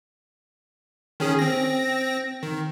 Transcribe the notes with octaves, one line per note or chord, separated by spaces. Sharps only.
D#3 C#4 G#4
C4 A#6
D#3